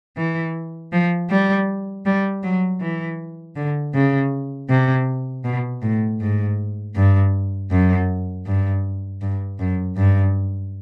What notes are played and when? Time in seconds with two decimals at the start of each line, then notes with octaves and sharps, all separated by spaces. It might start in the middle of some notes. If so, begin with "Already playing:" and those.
0.17 E3
0.93 F3
1.30 G3
2.06 G3
2.43 F#3
2.81 E3
3.56 D3
3.94 C#3
4.69 C3
5.45 B2
5.82 A2
6.20 G#2
6.96 G2
7.71 F#2
8.46 G2
9.22 G2
9.59 F#2
9.97 G2